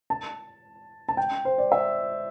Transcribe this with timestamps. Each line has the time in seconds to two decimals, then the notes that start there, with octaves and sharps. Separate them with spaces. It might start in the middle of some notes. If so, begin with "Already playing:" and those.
0.10 A5
1.09 A5
1.17 G5
1.45 C5
1.58 D5
1.72 E5